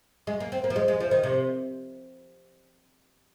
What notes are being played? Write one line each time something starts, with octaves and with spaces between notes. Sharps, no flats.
G#3
A#3
C4
A#3
F3
G#3
G#3
F3
D#3
C3